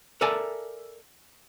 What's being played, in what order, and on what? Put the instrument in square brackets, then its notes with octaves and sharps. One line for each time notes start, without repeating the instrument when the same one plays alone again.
[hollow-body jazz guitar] A4 A#4 D5 E5 G#5 A5